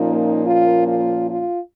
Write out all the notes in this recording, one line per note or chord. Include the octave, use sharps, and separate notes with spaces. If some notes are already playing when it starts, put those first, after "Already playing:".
Already playing: A#2 F3 A#3 C#4 D#4
F4
F4
F4